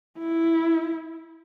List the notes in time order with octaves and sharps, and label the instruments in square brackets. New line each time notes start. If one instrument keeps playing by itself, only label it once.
[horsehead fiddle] E4